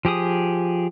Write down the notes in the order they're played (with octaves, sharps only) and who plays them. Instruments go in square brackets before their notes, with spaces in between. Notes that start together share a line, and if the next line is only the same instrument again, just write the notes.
[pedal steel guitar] F3 G4 G#4 D#6